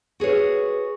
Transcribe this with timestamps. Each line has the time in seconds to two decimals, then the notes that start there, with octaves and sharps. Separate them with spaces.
0.20 F#4 G#4 B4 C#5